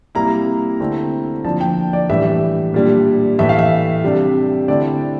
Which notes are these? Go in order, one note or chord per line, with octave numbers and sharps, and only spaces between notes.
C3 G3 A#3 E4 A#5
D3 A3 C4 E4
D3 F3 A#3 D4 A5
G5
D5
A2 E3 G3 D4 E5
A#2 G3 D4
A2 E3 A3 E5
F5
E5
C3 G3 D4
D3 A3 C4 E4 D5